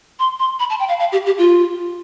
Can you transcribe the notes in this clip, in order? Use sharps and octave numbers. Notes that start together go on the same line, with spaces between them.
C6
C6
B5
A5
G5
F5
F5
G4
G4
F4